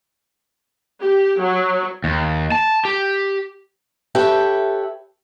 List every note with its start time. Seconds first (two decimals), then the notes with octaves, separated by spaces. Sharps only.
1.01 G4
1.40 F#3
2.04 D#2
2.52 A5
2.85 G4
4.15 G4 A4 B4 C#5 E5 G5